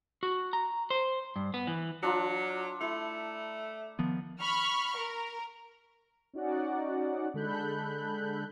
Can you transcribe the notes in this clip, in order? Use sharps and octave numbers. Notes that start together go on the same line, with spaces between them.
F#4
A#5
C5
G2
B3
E3
F#3 D4 F4 A#5
A3 E4
D#3 F3 B3
B5 C#6 F6
A#4
C#4 D#4 F#4 D5 F#5
D3 G#3 A4 B5 F#6 G6